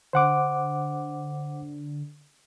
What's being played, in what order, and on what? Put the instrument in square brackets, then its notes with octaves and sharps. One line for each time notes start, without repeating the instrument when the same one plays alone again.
[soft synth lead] D3 [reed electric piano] C5 F#5 D6